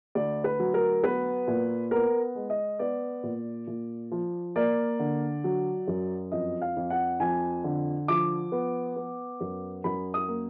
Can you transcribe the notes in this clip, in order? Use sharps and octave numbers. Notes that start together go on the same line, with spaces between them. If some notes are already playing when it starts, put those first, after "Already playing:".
D2 D5
B4
F#3
A#4
B3 B4
A#2
B3 A#4
G#3
D#5
B3 D5
A#2
A#2
F3
A#3 D5
D3
F#3
F#2
F2 D#5
F5
F2
F#5
F2 G#5
D3
F3 D6
B3
B3
F#2
F#2 B5
D#6
A#3